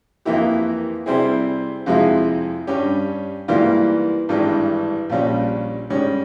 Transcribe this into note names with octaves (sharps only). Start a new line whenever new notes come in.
F2 E3 A#3 E4 G4
C3 G3 C4 E4 G#4
F2 C3 F3 G#3 E4
G2 G3 C#4 G4
G#2 E3 G3 A#3 F4
G#1 G2 E3 G3
A#1 A#2 G3 C#4
G#2 G3 C#4